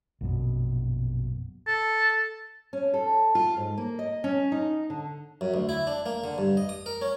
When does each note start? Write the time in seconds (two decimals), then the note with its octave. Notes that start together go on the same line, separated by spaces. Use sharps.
0.21 A#1 F#2 B2
1.67 A4
2.73 C#4
2.94 A4
3.35 F4
3.57 G#2
3.78 A#3
3.99 D#5
4.24 C#4
4.52 D#4
4.90 D3
5.41 F#2
5.54 D2
5.69 E4
5.87 D4
6.06 A#3
6.24 D3
6.38 G2
6.57 D#5
6.69 D#6
6.86 A#4
7.02 C#4